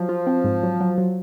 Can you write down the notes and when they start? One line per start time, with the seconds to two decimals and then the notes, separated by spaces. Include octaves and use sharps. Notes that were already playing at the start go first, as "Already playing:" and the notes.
Already playing: F3 F#3
0.09 F4
0.27 C4
0.44 G#2
0.63 F#3
0.81 F#3
0.98 F#3